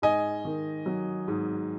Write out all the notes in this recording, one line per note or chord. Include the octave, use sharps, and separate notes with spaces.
G#2 D#5 G#5
D#3
F#3
G#2